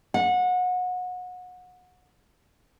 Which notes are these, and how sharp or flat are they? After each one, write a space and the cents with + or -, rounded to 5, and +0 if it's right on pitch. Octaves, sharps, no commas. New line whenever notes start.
F#5 -30